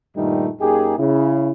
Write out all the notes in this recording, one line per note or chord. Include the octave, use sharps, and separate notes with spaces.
G2 A#2 D#3 G3 A3 D#4
F#2 A#3 D#4 G4 G#4
C#3 E4